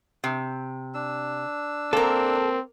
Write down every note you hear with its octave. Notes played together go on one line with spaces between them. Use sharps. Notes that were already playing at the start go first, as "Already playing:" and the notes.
C3
D4 E6
A#3 C4 A4 A#4